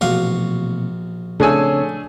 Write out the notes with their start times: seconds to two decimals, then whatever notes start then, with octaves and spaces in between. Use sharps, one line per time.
0.01 A#1 B2 E3 A3 F#4 F5
1.40 C#3 A3 C4 D4 G#4 C#5 G#5 E6